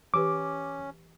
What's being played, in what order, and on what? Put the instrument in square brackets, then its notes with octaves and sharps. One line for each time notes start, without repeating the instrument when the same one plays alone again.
[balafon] E3 G4 B4 [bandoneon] C#4 [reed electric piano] D6